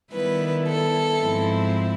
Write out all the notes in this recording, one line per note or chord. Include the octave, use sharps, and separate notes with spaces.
D#3 G3 B3 E4 B4
A4
G#2 F3 G#3 C4 E4